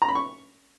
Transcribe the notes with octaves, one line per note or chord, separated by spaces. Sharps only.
A#5
B5
C#6